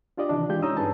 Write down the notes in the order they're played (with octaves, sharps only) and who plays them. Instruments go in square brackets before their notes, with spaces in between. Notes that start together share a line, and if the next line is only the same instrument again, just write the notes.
[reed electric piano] D4 F4 G4 D5 D#5
C3 D#3 E3 D4
E3 G#3 F4 G4 G6
C#4 D#4 C#5 A#5 D#6 E6
G2 D4 G#4 B4 A5